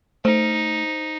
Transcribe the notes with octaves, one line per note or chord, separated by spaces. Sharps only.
A3 D#4 C5